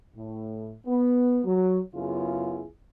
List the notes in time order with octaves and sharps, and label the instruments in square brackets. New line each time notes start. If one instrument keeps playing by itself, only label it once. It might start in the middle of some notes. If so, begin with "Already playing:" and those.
[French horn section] A2
B3
F#3
F#2 C#3 B3 E4 F4 G#4